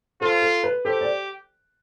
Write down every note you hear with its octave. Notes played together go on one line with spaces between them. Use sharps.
F4 A4 C5
A4
B4
G4 A4 C5
D5